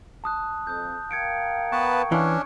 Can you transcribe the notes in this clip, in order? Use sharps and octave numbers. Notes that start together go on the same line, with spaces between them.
A5 D#6 F#6
F2 D#6 G6
A#4 F5 G5 G#6 C#7 D7
B3 B4 A5 C#6
E3 C#4 D4